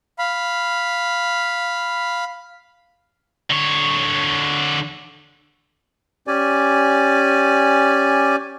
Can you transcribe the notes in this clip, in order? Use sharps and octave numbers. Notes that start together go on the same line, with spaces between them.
F5 B5
D3 C#5
C#4 G4 D5 G#5